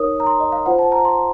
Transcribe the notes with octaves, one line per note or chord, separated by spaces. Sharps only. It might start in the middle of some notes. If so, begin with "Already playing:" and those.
Already playing: D#4 A#4 C#5 D#6
A#5
C6
D#5
F5
F4 C5 F#5
A5
A#5
C6